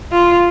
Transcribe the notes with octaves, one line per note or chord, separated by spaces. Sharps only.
F4